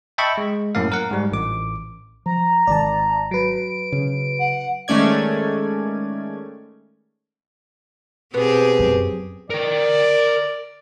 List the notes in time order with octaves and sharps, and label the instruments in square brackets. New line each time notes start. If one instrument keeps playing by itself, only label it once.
[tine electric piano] D#5 E5 G5 A5 B5 C#6
G#3
F#2 A2 A#3 F5
A#4 F#5
G#2 G3
A1 D6
[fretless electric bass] F3 [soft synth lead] A#5
[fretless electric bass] G#1 D#3 [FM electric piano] D5 A5
[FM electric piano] F#3 B4 [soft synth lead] D7
[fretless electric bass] C#3
[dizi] F#5
[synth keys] D#3 G#3 A3 C#4 D5 G#6
[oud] B2 B3 [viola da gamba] C4 G4 G#4
[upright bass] F#2
[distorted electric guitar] A#4 G5 [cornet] D5